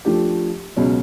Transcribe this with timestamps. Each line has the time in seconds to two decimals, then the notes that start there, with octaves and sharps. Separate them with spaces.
0.05 F3 A3 D4 G4
0.76 C#2 B2 F#3 C#4